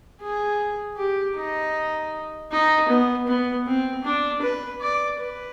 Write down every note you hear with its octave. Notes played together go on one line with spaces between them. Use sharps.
G#4
G4
D#4
D#4
B3
B3
C4
D4
B4
D5
B4